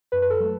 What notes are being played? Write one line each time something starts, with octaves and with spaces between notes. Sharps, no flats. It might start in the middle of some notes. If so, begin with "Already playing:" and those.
F#2 B4
B4
A4
F#3 A3